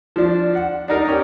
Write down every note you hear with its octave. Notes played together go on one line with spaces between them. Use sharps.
F3 D4
F#5
D4 D#4 A#4
C#4 G4